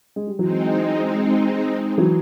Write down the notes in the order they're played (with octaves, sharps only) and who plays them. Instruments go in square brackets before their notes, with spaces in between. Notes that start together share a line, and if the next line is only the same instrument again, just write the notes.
[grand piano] G#3
G3
[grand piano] E3 F#3 [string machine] G#3 C4 D#4
[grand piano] E3 F#3